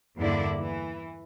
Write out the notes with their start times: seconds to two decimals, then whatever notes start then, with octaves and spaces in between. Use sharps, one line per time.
0.18 E2 G2 D3 A#3 E4 D5
0.58 E3